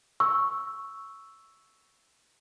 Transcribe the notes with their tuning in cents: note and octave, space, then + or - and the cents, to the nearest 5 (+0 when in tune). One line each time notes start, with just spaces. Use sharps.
C#6 +0 E6 +0